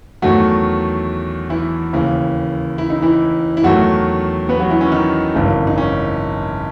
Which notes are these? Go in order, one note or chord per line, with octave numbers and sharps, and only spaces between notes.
E2 D#3 F#3 A3 F#4
E3 E4
D#2 C#3 E3
E4
D#4
E3 E4
E4
E2 D#3 F#3 A3 F#4
B3 B4
F#3 F#4
E3 E4
C#4
D#3 D#4
G#1 F#2 C#3 E3
D#4
C#4